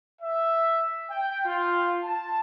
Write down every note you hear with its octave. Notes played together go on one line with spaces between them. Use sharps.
E5
G5
F4
A5